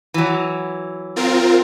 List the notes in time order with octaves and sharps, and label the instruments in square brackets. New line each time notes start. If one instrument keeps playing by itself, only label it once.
[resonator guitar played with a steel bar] E3 F#3
[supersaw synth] C4 F4 A#4